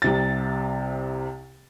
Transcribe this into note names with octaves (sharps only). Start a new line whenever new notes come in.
C2 C3 A6